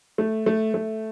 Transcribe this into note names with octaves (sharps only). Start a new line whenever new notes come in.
A3
A3
A3